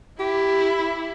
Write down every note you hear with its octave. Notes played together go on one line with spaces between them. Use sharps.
E4 G4